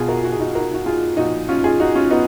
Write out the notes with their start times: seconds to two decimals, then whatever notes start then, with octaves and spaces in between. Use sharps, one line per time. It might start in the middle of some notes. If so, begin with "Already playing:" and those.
Already playing: B2 F4 G#4
0.08 F#4 A#4
0.24 F#4
0.32 G#4
0.40 D#4 F#4
0.55 F#4 A#4
0.74 F#4
0.86 F4 G#4
1.17 A#2 F3 D#4 F#4
1.49 C#4 F4
1.64 F4 G#4
1.80 D#4 F#4
1.95 C#4 F4
2.11 B3 D#4